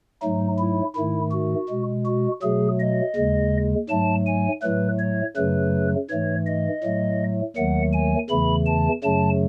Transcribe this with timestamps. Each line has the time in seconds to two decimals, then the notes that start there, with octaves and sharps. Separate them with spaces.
0.22 G#2 F#3 A3 D#4
0.59 E4
0.96 G#2 D#3 A3 E4
1.32 F#4
1.69 B2 G#3
2.06 F#4
2.42 B2 F#3 A3 G#4
2.80 D#5
3.16 D#2 C#3 G#3
3.89 G#2 F#3 A3 A5
4.26 G#5
4.62 A2 F#3 A3 B4
4.99 C#5
5.36 F#2 C#3 F#3 A3 B4
6.10 G#2 E3 A3 C#5
6.46 D#5
6.83 A2 F#3 A3
7.56 D#2 D#3 F#3 A3 F#5
7.93 G#5
8.29 E2 C#3 E3 A3 B5
8.66 A5
9.04 F#2 C#3 F#3 A3 A5